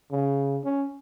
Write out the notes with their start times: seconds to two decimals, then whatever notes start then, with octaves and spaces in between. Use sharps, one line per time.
0.11 C#3
0.64 C#4